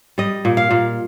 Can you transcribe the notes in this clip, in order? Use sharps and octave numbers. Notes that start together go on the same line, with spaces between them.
G3 D#5
A#2
F5
A#2